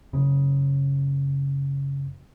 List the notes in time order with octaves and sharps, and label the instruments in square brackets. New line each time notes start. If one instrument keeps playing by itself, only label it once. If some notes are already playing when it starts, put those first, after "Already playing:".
[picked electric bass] F#1 C#3